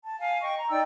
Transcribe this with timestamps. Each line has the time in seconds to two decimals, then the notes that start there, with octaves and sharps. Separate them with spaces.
0.03 A5
0.19 F5 G#5
0.42 D#5 G5 C#6
0.57 A#5
0.70 D#4 D5 G5 E6